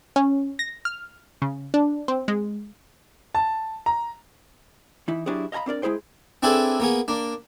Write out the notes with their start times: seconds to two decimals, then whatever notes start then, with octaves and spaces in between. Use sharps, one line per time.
0.16 C#4
0.59 A#6
0.85 F6
1.42 C#3
1.74 D4
2.08 C4
2.28 G#3
3.35 A5
3.86 A#5
5.08 E3 D#4 E4
5.26 F#3 D4 E4 G4 G#4
5.52 D#5 F5 G#5 A#5 B5
5.66 C4 D4 A#4 D5
5.82 G#3 E4 G#4 C5 G5
6.43 C4 D4 E4 G#4 A4 B4
6.80 A#3 B3 G#4
7.08 A#3 D4